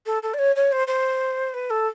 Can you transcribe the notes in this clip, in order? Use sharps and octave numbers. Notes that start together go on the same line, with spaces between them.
A4
A4
D5
C#5
C#5
C5
C5
B4
A4